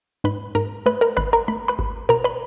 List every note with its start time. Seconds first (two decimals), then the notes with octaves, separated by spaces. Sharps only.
0.24 G#2 B4 B5
0.55 G#2 A#4 A#5
0.86 A3 B4 B5
1.01 A#4 A#5
1.17 G#1 B4 B5
1.33 A#4 A#5
1.48 A3 B5
1.68 B4 B5
1.79 G#1
2.09 B2 A#4 A#5
2.24 B4 B5